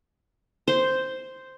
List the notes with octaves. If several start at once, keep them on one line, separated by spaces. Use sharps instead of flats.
C5